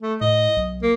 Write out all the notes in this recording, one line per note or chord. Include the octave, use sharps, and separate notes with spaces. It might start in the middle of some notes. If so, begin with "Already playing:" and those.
A3
A2 D#5
B1
A#3